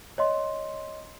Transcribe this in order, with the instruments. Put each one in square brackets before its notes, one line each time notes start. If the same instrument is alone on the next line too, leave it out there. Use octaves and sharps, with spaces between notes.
[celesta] C#5 D#5 C6